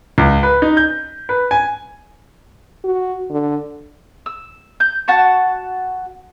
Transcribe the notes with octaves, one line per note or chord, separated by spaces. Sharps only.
C#2
B4
D#4
G6
B4
G#5
F#4
D3
E6
G6
F#4 F#5 A5 C#6